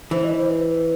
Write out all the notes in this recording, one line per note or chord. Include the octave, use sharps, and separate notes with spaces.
E3 C5
D#5
C5
B4